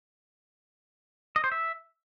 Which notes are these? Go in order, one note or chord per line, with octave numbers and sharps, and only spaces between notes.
D#5
C5
E5